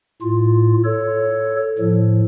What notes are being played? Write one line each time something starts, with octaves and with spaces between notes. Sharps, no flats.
A2 F4
A4 C#5
A2 F3